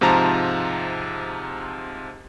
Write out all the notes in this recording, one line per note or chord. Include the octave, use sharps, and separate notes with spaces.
G#2 C3 F3 A5 A#5